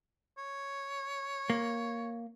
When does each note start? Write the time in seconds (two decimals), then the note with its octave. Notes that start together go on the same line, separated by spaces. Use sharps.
0.38 C#5
1.50 A#3